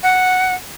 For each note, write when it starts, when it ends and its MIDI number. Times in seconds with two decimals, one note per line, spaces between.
0.03 0.54 78